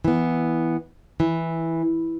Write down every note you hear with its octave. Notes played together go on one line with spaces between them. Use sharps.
E3 B3
E3